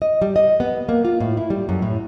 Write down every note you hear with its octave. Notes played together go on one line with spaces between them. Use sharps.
D#5
G3
D#5
B3
A#3
F4
A2
E4
G3
F#2
A2